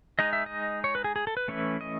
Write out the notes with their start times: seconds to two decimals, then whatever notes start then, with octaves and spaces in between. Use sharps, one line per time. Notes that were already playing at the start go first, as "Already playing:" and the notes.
0.19 G#3 D#4 D#5
0.33 E5
0.46 D#5
0.84 C#5
0.95 B4
1.04 G#4
1.16 G#4
1.27 A4
1.37 B4
1.48 E3 A3 C#4 E4
1.81 D#5